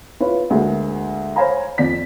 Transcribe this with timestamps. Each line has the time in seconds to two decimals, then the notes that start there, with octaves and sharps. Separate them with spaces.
0.20 E4 F4 B4 C#5 B5
0.50 D2 G#3 A#3
1.36 C5 C#5 F5 G#5 A#5 B5
1.78 F2 D5 B6